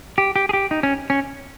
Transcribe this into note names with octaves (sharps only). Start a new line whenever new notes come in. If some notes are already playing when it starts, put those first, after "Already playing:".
G4
G4
G#4
G4
D#4
C#4
C#4